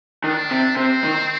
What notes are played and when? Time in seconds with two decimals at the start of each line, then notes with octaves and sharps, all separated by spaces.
0.24 D#3 D4
0.51 C3
0.77 C3 C4
1.04 D#3